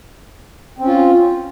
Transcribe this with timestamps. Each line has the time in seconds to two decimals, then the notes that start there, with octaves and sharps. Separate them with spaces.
0.79 C4
0.83 C#4
0.87 F4